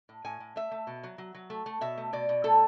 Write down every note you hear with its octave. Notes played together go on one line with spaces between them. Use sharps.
A2
A2 G#5
A2
A3 E5
A3
B2
F#3
F#3
F#3
A3
A3
B2 E5
A3
B2 D5
B2
A3 A4